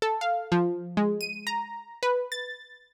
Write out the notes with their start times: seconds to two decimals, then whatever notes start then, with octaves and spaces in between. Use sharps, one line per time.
0.02 A4
0.21 F5
0.52 F3
0.97 G#3
1.21 D#7
1.47 A#5
2.03 B4
2.32 A6